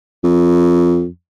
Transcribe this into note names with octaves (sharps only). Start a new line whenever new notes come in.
F2